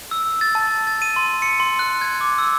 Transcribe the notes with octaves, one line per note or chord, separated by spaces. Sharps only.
E6
A6
A5
A6
D#7
C6
C#7
C6
F#6
G#6
D6
E6